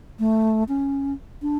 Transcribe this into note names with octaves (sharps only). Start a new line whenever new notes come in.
A3
C#4
D4